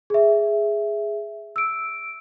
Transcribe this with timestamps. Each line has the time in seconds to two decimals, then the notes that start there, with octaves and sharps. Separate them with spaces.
0.10 G#4 E5
1.56 E6 D7